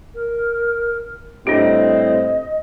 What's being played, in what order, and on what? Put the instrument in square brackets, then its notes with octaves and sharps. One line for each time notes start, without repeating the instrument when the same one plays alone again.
[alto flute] A#4
[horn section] A2 G3 C4 [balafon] D4 G4 [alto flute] D#5